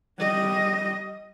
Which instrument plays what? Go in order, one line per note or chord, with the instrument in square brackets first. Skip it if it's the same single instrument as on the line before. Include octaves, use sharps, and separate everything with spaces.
[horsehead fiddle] G3 D#5